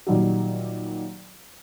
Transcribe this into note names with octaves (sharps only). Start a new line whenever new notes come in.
A#2 D#3 F#3 G3